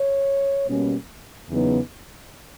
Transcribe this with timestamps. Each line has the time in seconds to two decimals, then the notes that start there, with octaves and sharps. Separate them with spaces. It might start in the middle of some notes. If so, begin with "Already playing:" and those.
Already playing: C#5
0.68 B2 G3 A#3 C#4
1.49 E2 C#3 F#3 B3 D#4